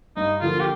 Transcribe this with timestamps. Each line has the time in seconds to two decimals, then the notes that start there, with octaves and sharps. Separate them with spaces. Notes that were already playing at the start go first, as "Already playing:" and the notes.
0.17 G2 D#4
0.41 D3 F3 A#3 F4
0.60 G4